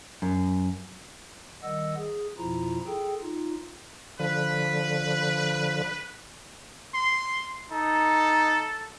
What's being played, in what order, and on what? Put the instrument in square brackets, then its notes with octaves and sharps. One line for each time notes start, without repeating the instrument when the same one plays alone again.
[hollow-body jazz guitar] F#2
[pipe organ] D#3 G3 D#5 F#5 E6
G#4
F2 B2 F3 E4 F4 A#5
G#4 A4 G5
D#4 F4
[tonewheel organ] D3 F3 [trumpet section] B4
[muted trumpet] C6
[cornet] D#4 [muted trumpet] A4